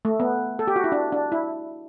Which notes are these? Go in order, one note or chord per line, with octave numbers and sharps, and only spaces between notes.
A3
B3
A4
G4
F#4
E4
D4
D4
E4